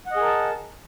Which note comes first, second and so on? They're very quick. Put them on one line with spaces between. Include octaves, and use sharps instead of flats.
F#5 D#5 G#4 A#4 A5